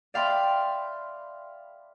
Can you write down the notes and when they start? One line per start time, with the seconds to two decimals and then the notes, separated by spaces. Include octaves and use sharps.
0.14 D5 E5 F5 G5 B5 C6